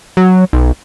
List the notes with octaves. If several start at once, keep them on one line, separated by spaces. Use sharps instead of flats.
F#3
B1